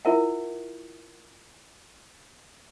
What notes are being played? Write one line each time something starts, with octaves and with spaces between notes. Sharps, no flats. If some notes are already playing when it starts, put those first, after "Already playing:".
E4 F4 A#4 E5 F#5